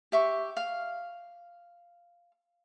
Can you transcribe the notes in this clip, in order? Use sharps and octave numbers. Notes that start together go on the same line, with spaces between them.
G4 E5 C#6
F5